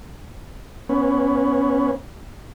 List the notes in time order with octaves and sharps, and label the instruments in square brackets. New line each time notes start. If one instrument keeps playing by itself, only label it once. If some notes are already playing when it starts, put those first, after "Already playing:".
[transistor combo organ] B3 C#4